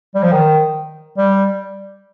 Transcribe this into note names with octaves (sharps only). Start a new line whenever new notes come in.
G3
F3
D#3
G3